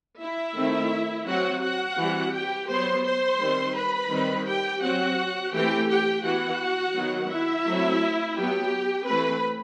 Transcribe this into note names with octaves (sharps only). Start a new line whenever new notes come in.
E4 E5
D#3 A3 C4
F#3 C4 F#4 F#5
F#4 F#5
E3 G3 C4
G4 G5
F#3 B3 C5 C6
C5 C6
D#3 G3 C4
B4 B5
D#3 G3 C4
G4 G5
F#3 C4 F#4 F#5
E3 A3 C4 G4 G5
G4 G5
E3 B3 F#4 F#5
D#3 F#3 B3
E4 E5
F#3 A3 C4
F#3 B3 G4 G5
E3 A3 C4 B4 B5